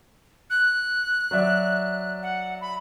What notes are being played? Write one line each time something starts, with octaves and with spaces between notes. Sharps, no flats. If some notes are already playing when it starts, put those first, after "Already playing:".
F#6
F#3 D5 E5
F#5
B5